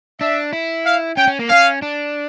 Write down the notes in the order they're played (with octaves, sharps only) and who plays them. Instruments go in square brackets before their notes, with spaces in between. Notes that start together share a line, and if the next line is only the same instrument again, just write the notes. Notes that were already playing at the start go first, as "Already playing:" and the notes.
[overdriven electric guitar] D4 [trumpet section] E5
[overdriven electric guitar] E4
[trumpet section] F5
[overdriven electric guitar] C#4 [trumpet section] G5
[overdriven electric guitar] C#4
A#3
[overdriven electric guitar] C#4 [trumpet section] F5
[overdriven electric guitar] D4